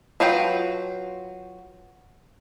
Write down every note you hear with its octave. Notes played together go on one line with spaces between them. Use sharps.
F#3 F4 B4 G5